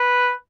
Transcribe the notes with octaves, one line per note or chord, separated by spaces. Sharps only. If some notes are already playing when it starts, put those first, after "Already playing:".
Already playing: B4